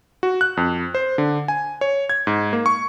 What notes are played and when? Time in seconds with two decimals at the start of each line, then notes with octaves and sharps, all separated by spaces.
0.23 F#4
0.41 F#6
0.57 F2
0.95 C5
1.18 D3
1.48 G#5
1.81 C#5
2.09 G#6
2.27 G#2
2.53 A#3
2.66 C#6